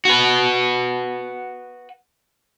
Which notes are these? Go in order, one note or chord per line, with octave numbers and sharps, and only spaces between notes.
F#4 B4